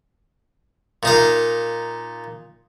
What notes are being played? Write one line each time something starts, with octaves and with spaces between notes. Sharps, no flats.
A#2 D#4 F5